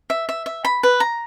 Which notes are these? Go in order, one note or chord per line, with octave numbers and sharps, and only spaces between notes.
E5
E5
E5
B5
B4
A#5